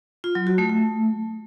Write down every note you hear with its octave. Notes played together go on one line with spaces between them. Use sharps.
F4
F#3
F#4
A3
A3